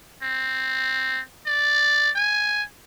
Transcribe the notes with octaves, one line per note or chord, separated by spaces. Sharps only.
C4
D5
G#5